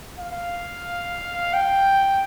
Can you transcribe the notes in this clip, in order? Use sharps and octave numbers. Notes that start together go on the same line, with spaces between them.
F5
G5